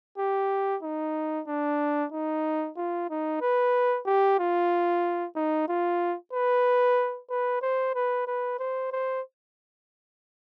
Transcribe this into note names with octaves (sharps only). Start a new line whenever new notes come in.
G4
D#4
D4
D#4
F4
D#4
B4
G4
F4
D#4
F4
B4
B4
C5
B4
B4
C5
C5